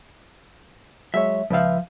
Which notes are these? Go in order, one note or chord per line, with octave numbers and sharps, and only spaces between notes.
F#3 G#3 C#5 E5
C#2 F3 B4 E5 F5